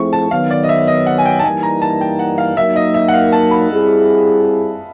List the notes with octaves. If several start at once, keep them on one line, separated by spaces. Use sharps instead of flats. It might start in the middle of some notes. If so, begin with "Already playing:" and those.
Already playing: F3 A3 C4 E4 G#4 C#6
A5
D#3 F#3 B3 F5
D5
D#5
E5
D#5
F#5
G#5
G5
A5
E3 G3 A#3 D#4 G#5
A#5
A5
G5
F#5
F5
F#3 A#3 D#4 E5
D#5
E5
F#5
F5
A5
B5
G3 C4 E4 G#4